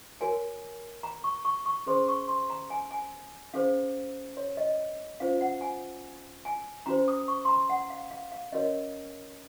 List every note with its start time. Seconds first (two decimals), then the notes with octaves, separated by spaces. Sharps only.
0.21 F#4 A#4 C#5 G#5
1.03 A#5
1.24 C#6
1.45 C#6
1.66 C#6
1.86 C#4 G#4 C5 C6
2.08 C#6
2.28 C6
2.50 A#5
2.70 G#5
2.91 G#5
3.54 C#4 G#4 C5 F5
4.37 C#5
4.57 D#5
5.20 C#4 F4 C5 F5
5.41 F#5
5.61 G#5
6.45 G#5
6.86 C#4 F#4 C5 A#5
7.08 D#6
7.28 C#6
7.45 C6
7.48 A#5
7.69 F#5
7.90 F5
8.11 F5
8.32 F5
8.52 C#4 F#4 A#4 C#5 D#5